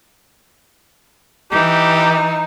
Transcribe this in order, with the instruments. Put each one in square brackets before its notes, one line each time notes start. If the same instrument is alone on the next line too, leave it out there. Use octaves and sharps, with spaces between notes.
[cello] E3 [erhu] D#4 [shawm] G4